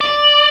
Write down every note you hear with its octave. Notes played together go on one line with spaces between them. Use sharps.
D5